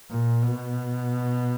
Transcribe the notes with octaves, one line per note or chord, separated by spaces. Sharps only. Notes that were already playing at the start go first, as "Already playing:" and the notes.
A#2
B2